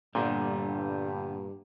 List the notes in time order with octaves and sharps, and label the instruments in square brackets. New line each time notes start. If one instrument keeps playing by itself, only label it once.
[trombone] G2 [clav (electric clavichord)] A#2 [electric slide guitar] D3 G3 B3